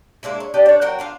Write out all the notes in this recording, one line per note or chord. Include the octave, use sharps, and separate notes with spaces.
G#3 A#3 D4 E4
C#5
D4 G4 D5 D#5
D4 C#5
F#3 F#4 A#4 G5
D4 F4 F5